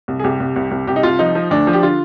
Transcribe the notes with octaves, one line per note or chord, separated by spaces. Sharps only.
C2
G#4
C2 G4
C2
C2
C2
C2 G4
D#4
C2 F4
F3 D#4
F3
D2 D4
F3
G4
D3 F4